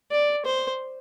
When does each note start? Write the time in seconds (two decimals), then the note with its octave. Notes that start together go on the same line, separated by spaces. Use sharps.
0.12 D5
0.46 C5